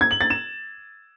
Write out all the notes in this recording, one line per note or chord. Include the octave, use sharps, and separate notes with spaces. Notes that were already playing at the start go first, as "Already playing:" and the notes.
G#6
F#7
A6
E7